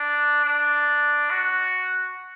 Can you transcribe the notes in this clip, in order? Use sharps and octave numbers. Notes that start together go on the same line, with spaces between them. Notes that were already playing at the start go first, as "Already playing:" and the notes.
Already playing: D4
D4
F#4